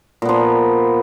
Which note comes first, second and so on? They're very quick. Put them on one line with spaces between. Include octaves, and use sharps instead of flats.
A#2 B3 F3